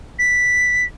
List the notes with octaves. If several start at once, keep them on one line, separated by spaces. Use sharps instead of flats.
B6